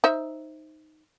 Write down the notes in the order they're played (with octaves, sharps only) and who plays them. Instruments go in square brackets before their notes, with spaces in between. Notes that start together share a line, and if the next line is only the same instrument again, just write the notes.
[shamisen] D#4 C5 E5